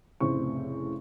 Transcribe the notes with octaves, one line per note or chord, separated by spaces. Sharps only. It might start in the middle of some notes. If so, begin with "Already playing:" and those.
F1 A2 C#3 C4 C#6